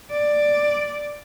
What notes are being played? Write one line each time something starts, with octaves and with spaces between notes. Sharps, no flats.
D5